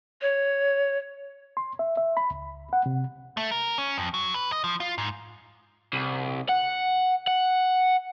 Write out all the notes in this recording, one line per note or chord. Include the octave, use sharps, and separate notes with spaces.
C#5
C6
E5
E5
B5
C#2
F#5
C3
A3
A#4
C#4
F2
F#3
B4
D#5
F3
F4
G#2
C2
F#5
F#5